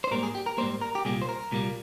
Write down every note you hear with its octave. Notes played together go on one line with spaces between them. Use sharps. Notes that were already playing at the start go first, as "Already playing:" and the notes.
C5
G#2 G3 A#3 A#4
G#4
G4
A#4
G#2 G3 A#3 C5
A#4
G4
C2 A#2 G3 A#3 G#4
C5
A#4
C2 A#2 G3 A#3